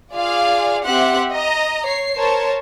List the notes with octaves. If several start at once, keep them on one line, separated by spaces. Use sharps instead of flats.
F4 G#4 D5 F5
C4 G4 E5 F#5 C6 F#6
D#5 A#5
C#5 C7
A#4 C5 C#5 A5